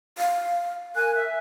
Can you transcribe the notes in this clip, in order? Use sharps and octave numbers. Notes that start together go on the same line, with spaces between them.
F5
A#4 G#5 F#6
E5